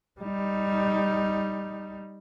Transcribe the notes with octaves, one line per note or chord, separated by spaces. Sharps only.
G3 D#4